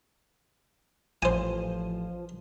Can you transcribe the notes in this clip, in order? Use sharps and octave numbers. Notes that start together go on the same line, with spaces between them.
A1 F3 C5 G#5